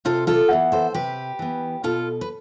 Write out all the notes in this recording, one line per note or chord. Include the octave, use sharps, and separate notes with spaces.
C3 F4 A4
F4 A4
E3 B3
A4 C5
C3 G4 B4
E3 B3
B2 F4 A4
B4